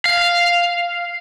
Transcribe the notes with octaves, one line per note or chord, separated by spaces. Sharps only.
F5